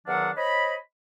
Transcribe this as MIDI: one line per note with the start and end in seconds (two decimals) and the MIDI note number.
0.07 0.31 40
0.07 0.31 51
0.07 0.31 54
0.07 0.31 62
0.07 0.31 77
0.07 0.31 78
0.37 0.76 72
0.37 0.76 73
0.37 0.76 75
0.37 0.76 83